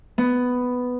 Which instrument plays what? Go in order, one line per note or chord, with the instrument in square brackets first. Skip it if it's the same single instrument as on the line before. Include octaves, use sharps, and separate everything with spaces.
[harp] B3